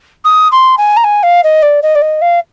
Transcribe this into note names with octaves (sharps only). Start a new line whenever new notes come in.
D#6
C6
G#5
A#5
G#5
F5
D#5
D5
D#5
D5
D#5
F5